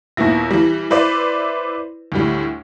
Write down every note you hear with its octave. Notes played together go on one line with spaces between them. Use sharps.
D#2 A#2 B3 E4 A#6
E3 G3
E4 B4 C5 D5
D2 A2 G3